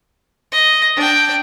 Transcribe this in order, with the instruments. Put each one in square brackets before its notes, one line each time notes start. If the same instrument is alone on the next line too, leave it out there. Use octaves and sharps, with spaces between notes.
[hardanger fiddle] D#5
D4 G5